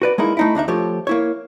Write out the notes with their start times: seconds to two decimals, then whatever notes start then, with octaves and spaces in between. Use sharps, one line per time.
0.02 F#4 B4 D5
0.18 G#3 A#3 D#4 E4
0.37 A3 D#4 E4
0.55 D2 D4 D#4 E5
0.68 F3 A3 F4 G4 C#5
1.07 A#3 E4 C#5